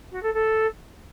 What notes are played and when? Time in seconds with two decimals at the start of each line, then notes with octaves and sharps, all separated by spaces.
0.11 F#4
0.23 A4
0.34 A4